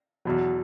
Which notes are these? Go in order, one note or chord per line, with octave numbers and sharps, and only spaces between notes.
E2 B2 F#3